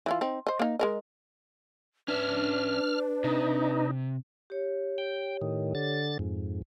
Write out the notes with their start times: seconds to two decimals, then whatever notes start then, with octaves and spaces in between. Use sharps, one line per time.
0.06 E3 E4 F4
0.21 C4 D#4
0.47 C5 D#5
0.59 A#3 D#4
0.79 G#3 A#4 D#5
2.08 C#4 D4 B4 E5 F6
3.24 C3 D#4
4.50 G4 C#5
4.98 G5
5.41 A2 D#3
5.75 D3 A6
6.19 F2 G#2